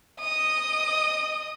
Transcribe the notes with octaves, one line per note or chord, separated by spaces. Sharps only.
D#5 D#6